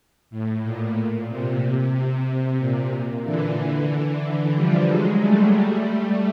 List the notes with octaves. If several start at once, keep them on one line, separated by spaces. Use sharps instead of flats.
A2
A#2
C3
C3
C3
C3
A#2
A#2
D3 E3
D3 E3
D3 E3
F3 G3
F#3 G#3
G3 A3
G3 A3